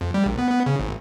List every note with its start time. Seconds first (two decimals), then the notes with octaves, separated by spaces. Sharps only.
0.01 F2
0.14 G3
0.26 A#1
0.38 B3
0.50 B3
0.66 C#3
0.79 G#1